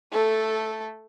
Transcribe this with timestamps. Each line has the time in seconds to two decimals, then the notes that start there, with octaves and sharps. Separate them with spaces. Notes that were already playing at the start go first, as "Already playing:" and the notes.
0.12 A3 A4